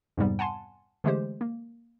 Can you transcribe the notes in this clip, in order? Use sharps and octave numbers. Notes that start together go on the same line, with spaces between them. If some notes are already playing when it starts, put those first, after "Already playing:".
F2 G#2 C3 G3 B3
F#5 G#5 A5 C6
D3 E3 G#3 A3 G4 C5
A#3